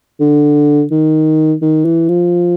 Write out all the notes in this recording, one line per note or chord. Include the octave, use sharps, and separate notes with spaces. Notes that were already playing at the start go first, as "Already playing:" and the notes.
D3
D#3
D#3
E3
F3